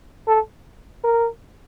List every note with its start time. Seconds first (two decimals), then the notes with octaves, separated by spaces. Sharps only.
0.28 A4
1.04 A#4